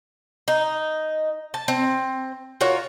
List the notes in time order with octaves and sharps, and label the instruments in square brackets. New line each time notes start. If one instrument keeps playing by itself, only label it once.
[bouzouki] D#4
A5
C4
F4 F#4 A#4 C#5